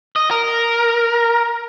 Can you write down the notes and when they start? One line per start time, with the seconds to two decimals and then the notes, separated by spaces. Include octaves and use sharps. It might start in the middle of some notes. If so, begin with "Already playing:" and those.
0.16 D#5
0.31 A#4